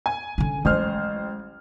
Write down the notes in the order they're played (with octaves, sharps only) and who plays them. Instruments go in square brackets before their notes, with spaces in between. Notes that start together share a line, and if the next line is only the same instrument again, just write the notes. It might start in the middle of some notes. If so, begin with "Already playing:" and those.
[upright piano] G#5
[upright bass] D3 C#4
[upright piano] A1 C5 F6 [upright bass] F#3 G#3